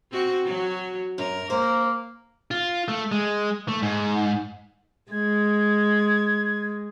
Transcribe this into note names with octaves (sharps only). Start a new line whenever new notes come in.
C4 F#4
F#3 F#4
F#2 A#4
A#3 C5
F4
A3
G#3
A3
G#2
G#3 G#6